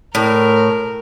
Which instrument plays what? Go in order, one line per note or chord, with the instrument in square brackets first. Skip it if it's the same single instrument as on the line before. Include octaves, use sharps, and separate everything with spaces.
[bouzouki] A2 [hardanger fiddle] A#4